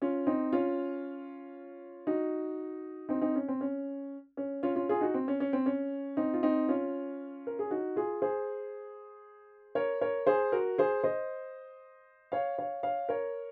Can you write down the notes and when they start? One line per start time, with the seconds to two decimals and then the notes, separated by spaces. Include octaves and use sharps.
0.02 C#4 F4
0.27 C4 D#4
0.52 C#4 F4
2.07 D#4 F#4
3.09 C4 D#4
3.21 C4 D#4
3.36 C#4
3.48 C4
3.61 C#4
4.37 C#4
4.63 C#4 F4
4.76 C#4 F4
4.89 F4 G#4
5.01 D#4 F#4
5.14 C4
5.28 C#4
5.40 C#4
5.53 C4
5.66 C#4
6.17 C4 D#4
6.34 F4
6.43 C4 D#4
6.69 C#4 F4
7.47 A#4
7.59 G#4
7.71 D#4 F#4
7.96 F4 G#4
8.22 G#4 C5
9.75 A#4 C#5
10.01 A#4 C#5
10.27 G#4 C5
10.52 F#4 A#4
10.78 G#4 C5
11.04 C5 D#5
12.32 C#5 F5
12.58 C#5 F5
12.83 C#5 F5
13.09 A#4 C#5